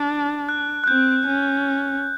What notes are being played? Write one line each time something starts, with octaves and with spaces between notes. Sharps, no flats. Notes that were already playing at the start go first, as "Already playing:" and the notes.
Already playing: D4
F#6
F#6
C4 G6
C#4